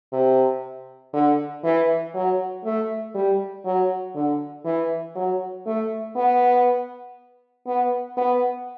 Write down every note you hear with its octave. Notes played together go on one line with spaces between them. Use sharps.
C3
D3
E3
F#3
A3
G3
F#3
D3
E3
F#3
A3
B3
B3
B3